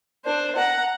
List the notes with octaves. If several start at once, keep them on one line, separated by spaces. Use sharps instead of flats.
D4 C5
F#5 A#5